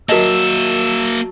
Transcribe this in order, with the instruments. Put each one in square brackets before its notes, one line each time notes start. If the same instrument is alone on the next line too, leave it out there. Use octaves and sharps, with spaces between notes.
[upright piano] F#3 A5 [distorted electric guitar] A#3 E5 [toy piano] A#4 D#5 [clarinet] E6